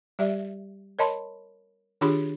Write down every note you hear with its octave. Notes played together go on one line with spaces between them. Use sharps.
G3 G4 D5 E5
A#4 C#5 D#5 A5 B5 C6
D#3 D4 F4 G4 G#4 B5